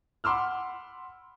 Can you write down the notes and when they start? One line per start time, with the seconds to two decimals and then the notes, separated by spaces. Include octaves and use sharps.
0.24 F#5 B5 C6 D6 E6 F6